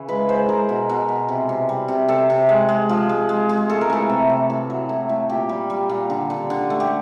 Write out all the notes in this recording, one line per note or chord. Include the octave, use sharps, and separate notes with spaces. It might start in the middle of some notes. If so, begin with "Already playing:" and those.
Already playing: C#3 E3
G#3 B4
G#3 C5
G#3 A#4
B2
B2
B2
C3
C3
G3
C3
C3 A4
C3
G#3
G#3
F3
G#3
G#3
G#3
A3 A4
A#4
E3 A4
C3
C3
A2
F#3
A2
A2
A#2 G4
G3
G3
A#2
D3
D3
D3
A3
G4